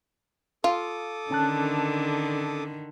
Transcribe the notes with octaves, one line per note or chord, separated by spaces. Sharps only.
F4 A4 D6 D#6
D3 D#3 C#4 A5 F#6